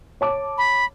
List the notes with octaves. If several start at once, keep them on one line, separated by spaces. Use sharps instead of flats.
C#5 A5 D6
B5